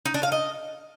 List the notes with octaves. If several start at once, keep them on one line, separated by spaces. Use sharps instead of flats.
D#4
D4
F5
D#5